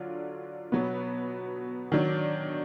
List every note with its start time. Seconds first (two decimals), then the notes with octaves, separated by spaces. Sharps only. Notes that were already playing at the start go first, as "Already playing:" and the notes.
Already playing: D3 F#3 D4 F4
0.72 B2 F#3 B3
1.92 D#3 F#3 D4